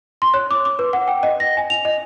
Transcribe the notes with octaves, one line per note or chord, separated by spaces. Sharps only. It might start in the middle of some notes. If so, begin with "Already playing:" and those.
C6
C#5
D6
D6
B4
F#5
G5
D#5
A#6
G#5
F7
D#5